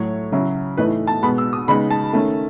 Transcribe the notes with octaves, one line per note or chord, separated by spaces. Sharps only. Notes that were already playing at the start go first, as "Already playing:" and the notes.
Already playing: A2 F#3 A3 C#5
C#3 F#3 C#4 E4
A2 E3 A3 D#4 B4
A5
B2 G#3 B3 B5
E6
D#6
C#3 G#3 B3 D#4 B5
A5
D#3 A3 C#4